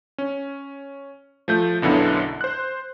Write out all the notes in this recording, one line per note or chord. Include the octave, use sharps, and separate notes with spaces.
C#4
F3 A3 G6
B1 F#2 D3 B3 E4
C5 F#6